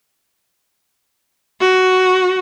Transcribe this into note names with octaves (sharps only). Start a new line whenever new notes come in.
F#4